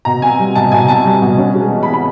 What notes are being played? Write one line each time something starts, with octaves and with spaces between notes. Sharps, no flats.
B2 A#5
C4 G#5
G3
B2 A5
B2 G#5
C4 A5
G3
B2
C#4
G#3
E3
B5
C3
B5